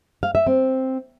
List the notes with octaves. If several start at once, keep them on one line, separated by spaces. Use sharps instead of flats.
F5
E5
C4